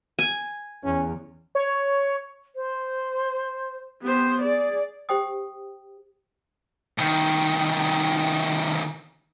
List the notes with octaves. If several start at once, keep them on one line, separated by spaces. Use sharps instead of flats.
G#5
E2 C#4
C#5
C5
B3 G4 C5
G#4 D5
G4 C5 G5 D#6
C2 D#3